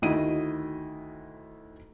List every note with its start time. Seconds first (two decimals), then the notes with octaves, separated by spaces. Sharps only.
0.02 D2 D#3 E4 F#4 D#5 D#7